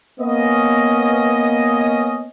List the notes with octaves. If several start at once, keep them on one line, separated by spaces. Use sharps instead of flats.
A#3 B3 C#4 D#5